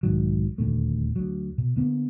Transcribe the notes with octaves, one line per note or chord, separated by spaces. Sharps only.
B1 G#2 D#3 F#3
D#1 D2 A#2 A3
D2 F#3
B2
D3 A#3 B3